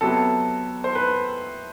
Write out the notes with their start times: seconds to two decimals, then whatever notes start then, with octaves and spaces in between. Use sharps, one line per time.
0.01 C3 F#3 B3 A4
0.84 C5
0.95 B4